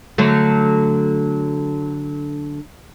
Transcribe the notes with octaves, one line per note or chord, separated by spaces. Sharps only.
D3 F#3 A3